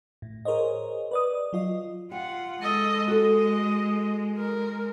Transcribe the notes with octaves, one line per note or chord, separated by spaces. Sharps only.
A2
G#4 A#4 C5 C#5 D#5
B4 D5 D#6
F#3 F4 D#5
F4 G4 F#5
G#3 A4 D#5
F#4 A4 D#5
A#4